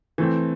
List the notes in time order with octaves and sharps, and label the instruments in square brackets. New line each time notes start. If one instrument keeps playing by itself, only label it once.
[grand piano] E3 A3 C4